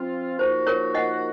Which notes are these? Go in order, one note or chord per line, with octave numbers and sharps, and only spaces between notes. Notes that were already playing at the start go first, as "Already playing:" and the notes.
Already playing: F3 C4 F4
F3 A#3 D#4 F#4 C5
A#4 C#5
D#5 F#5